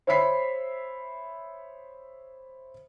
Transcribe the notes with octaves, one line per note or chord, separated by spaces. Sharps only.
C5 C#5 E5 B5 B6 C7